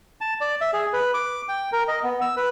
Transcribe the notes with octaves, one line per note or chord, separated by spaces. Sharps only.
A5
D5
E5
G#4
B4
D6
G5
A#4
D#5
B3
E6
B4